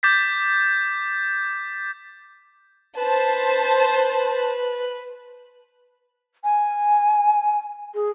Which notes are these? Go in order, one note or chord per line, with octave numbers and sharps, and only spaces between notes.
D6 G6 A6 B6
B4 C5 A5
G#5
G#4